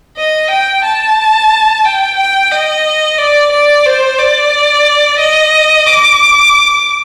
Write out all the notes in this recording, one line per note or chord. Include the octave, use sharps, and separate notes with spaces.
D#5
G5
A5
G5
G5
D#5
D5
D5
C5
D5
D#5
D6